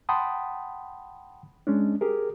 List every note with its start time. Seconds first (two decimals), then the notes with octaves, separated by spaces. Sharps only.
0.09 F#5 G5 A5 B5 C6 D#6
1.67 G#3 C#4 D4
2.01 G4 G#4 A#4